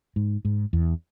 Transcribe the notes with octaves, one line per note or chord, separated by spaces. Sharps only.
G#2
G#2
E2